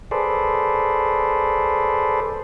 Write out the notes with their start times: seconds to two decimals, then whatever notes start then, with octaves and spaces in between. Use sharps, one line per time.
0.11 G#4 A4 B4 C5 D5